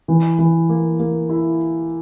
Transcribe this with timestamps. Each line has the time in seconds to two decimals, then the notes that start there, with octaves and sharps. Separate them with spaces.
0.08 E3
0.39 E3
0.69 A#3
1.00 A#3
1.29 E4